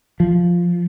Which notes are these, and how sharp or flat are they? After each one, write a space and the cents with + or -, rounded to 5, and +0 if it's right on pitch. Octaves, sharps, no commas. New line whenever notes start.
F3 +0